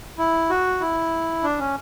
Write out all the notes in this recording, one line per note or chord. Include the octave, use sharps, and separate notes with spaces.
E4
F#4
E4
D4
C#4